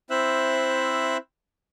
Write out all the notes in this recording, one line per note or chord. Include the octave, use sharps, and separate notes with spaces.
C4 E4 C5 E5 E6 F#6